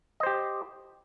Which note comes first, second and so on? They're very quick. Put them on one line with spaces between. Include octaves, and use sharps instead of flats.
D#5 C5 G4